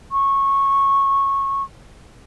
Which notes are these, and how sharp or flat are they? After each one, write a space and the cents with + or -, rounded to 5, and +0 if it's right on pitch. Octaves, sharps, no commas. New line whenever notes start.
C#6 -15